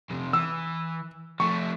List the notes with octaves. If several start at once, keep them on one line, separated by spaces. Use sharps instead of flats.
F2 C3
E3 E6
F3 A3 C#6